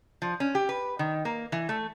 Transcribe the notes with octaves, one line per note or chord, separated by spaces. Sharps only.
F3
C#4
G4
B4
D#3
A#3
E3
A3